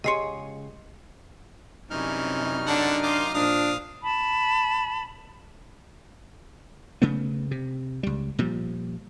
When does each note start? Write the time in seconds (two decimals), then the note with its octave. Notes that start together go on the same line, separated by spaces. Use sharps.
0.04 C#2 G4 G#4 C#5 D#5 C6 C7 C#7
1.90 F#2 C3 E3 G3 C#4 D#4 F6
2.67 D3 D4 F#5 A5
3.03 D#3 F5 C6 D6 D#6
3.34 A#2 F3 D4 F5 D#6
4.03 A5 B5
7.02 C#3 A3 B3
7.51 C3
8.03 C#2 G3
8.39 A#2 F3 G3